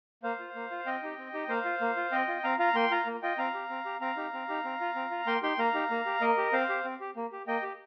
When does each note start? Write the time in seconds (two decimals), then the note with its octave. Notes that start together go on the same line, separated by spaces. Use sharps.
0.23 A#3 C5 F5
0.39 F4
0.55 A#3
0.71 F4
0.86 C4 D#5 G5
1.03 D#4 G4
1.18 C4
1.34 D#4 G4
1.49 A#3 C5 F5
1.65 F4
1.81 A#3
1.96 F4
2.12 C4 D#5 G5
2.28 F4
2.44 C4 F5 A#5
2.59 F4 F5 A#5
2.75 A#3 G5 C6
2.91 F4 F5 A#5
3.06 A#3
3.22 F4 D#5 G5
3.38 C4 F5 A#5
3.54 G4
3.70 C4
3.85 G4
4.01 C4 F5 A#5
4.17 D#4 G4
4.33 C4
4.48 D#4 G4
4.64 C4
4.80 F4
4.95 C4
5.11 F4
5.27 A#3 G5 C6
5.42 D#4 G4 G5 C6
5.59 A#3 F5 A#5
5.74 D#4 G4
5.91 A#3
6.06 G4
6.21 A#3 A#4 D#5
6.38 G4
6.53 C4 C5 F5
6.69 G4
6.85 C4
7.01 G4
7.16 A#3
7.32 G4
7.47 A#3 D#5 G5
7.63 G4